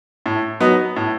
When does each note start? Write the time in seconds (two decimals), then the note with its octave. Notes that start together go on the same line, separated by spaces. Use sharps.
0.26 A2
0.60 F#3 B3 D#4
0.96 A2